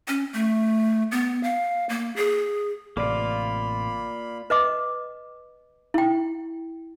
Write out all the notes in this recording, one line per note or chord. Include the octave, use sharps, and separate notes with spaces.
C#4
A3
B3
F5
A#3
G#4
A1 C3 A#3 F4 D5 B5
B4 D#5 D6
E4 G5